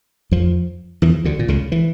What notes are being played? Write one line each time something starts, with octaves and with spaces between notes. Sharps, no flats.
F2 F3
E2 E3
D2 D3
A#2
C#2 C#3
E3